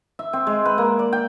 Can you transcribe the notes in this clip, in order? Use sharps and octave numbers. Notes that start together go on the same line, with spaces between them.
E5
C4
G#3
B4
A#3
D5
G5